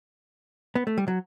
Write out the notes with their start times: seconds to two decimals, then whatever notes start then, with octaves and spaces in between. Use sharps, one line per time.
0.75 B3
0.87 A3
0.98 G3
1.08 F#3